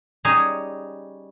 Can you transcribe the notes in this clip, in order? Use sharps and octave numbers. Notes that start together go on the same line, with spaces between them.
G3 C#4 D#4 G#4 C#5